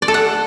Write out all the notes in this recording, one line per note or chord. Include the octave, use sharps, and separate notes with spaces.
D5
A4
F#5